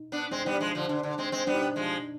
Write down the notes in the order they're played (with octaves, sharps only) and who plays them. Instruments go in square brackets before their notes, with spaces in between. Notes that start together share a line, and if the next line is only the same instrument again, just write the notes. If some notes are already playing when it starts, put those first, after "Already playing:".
Already playing: [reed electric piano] D#4
[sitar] B3 D4
[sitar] G#3 C4 [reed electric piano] D4
[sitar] G3 B3 [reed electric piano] D#4
[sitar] F3 G#3 [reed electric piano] D4
[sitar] D3 F3
D3
D3
G#3 C4
G#3 C4
[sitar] G3 B3 [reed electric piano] D4
[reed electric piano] D#4
D4
[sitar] F3 G#3